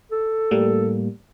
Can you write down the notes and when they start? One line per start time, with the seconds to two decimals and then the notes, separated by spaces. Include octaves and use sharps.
0.12 A4
0.51 A2 G3 A#3